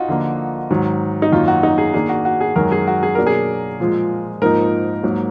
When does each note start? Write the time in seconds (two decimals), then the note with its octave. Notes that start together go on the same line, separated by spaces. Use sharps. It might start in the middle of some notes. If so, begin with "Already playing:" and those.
Already playing: D#4 F4 F#4
0.08 D3 F3 A#3
0.70 G#2 D#3 F#3
1.22 D#4
1.32 F#2 D#3 F#3 A#3 F4
1.48 F#4
1.63 D#4
1.78 G#4
1.94 D#3 A#3 D4 G#4
2.09 F#4
2.25 F#4
2.41 G#4
2.56 F#2 D#3 G#3 A#4
2.72 G#4
2.87 F#4
3.03 G#4
3.15 B2 F#3 A#3 D4 A#4
3.27 G#4
3.80 A#2 F3 G#3
4.42 G#2 F3 A#3 D#4 A#4
5.03 G#2 F#3 A#3